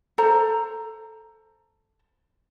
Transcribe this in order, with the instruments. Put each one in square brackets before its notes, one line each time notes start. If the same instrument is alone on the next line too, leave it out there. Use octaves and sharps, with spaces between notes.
[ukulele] A4 C5 A#5